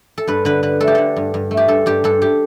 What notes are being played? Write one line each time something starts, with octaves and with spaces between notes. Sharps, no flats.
A4
G2 B4
D3 B4
D3 B4
A3 A4
G4
D3 A4
G2
G2
A3
G4
G2 A4
G2 G4
G2 A4
G4